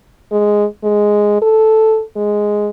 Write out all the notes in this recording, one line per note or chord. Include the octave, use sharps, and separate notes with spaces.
G#3
G#3
A4
G#3